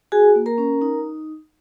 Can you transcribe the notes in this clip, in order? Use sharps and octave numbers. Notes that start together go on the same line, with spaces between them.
F#4 G#4 G#5
A#3
A#4 A#5
C#4
D#4